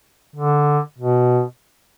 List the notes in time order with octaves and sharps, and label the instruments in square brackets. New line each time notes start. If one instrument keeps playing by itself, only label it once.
[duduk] D3
B2